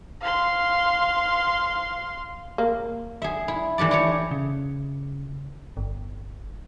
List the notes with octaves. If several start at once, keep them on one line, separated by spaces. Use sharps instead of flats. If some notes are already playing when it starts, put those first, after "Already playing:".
F5 C6
A#3
G#4 E5
E4
E3 A3 G4 D5
E4 G4 C#5
C#3
G1